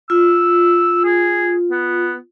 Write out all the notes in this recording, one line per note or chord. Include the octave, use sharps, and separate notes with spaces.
F4 E6
G#4
B3